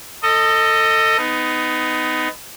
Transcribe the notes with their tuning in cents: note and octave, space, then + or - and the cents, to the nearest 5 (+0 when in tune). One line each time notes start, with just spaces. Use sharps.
A4 +25 D#5 +0
B3 +25 D#4 +0